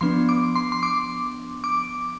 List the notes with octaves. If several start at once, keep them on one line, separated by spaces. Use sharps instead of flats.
F3 B3 D4 C6
D6
C6
C6
D6
D6